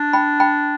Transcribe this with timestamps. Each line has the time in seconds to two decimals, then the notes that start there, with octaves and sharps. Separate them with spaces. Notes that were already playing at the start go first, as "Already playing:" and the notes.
Already playing: D4
0.13 G5 B5
0.40 G5 B5